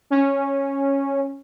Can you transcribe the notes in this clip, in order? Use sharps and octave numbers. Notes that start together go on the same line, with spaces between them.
C#4